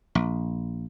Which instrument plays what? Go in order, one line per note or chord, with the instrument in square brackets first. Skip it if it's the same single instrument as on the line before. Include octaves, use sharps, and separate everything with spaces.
[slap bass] A#1